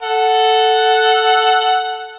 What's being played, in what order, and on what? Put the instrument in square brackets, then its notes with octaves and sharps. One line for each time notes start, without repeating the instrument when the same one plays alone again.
[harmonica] A4 F#5